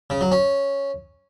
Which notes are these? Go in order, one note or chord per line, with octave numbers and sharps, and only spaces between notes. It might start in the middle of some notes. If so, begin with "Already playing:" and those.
C#3
F#3
C#4